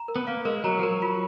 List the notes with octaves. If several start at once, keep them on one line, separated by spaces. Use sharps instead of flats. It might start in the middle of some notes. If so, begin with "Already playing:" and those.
Already playing: A#5
A#4
B3
A#3 F5
G#3 A#4
F#3 A#5
F3
F#3 A#4
F#3 F4